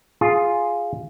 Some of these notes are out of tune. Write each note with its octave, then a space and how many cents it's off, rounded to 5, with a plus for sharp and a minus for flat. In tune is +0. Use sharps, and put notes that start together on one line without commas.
F4 +0 G#4 +0